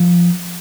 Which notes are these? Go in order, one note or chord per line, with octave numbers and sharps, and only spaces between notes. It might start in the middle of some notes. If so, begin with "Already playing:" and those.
Already playing: F3